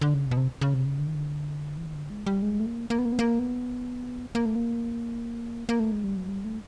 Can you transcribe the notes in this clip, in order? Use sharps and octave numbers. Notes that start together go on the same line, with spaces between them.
D3
C#3
C3
B2
C3
C#3
C3
C#3
D3
D#3
D3
E3
D#3
D3
G#3
G3
G#3
A3
A#3
A#3
B3
A#3
B3
A#3
B3
A#3
A3
A#3
A#3
A3
G#3
G3
F#3
G3
A3